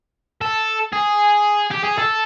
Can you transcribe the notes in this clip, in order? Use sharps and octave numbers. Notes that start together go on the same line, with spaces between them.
A4
G#4
G4
G#4
A4